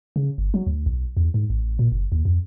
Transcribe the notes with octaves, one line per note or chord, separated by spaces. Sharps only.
C#3
G1
F#3
D2
B1
E2
G#2
A1
A#2
F#1
D#2
F2